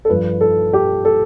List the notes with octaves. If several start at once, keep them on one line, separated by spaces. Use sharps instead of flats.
A4
G2 F3 B4
A4
G4
A4